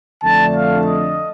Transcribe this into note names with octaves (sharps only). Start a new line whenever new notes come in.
F2 D3 A3 D4 A5
F5
D#5